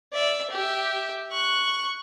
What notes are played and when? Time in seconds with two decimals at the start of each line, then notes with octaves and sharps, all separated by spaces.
0.13 D5 E5
0.51 G4 E5
1.32 C#6 F#6